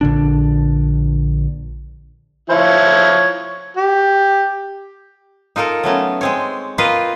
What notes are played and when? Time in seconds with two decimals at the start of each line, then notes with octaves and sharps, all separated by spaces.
0.01 A#1 D3 D4
2.50 F3 E4 C#5
3.77 G4
5.56 D#4 F4 A4 A#4
5.83 F#3 A3 B3 C#4
6.21 G#3 C4 C#5
6.78 A#3 F4 B4 D#5 F5 G5